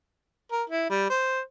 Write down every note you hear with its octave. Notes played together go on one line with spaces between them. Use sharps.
A#4
E4
G3
C5